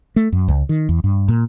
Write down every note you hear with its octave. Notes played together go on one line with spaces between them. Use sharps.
A3
F#2
C#2
D#3
E2
G2
A#2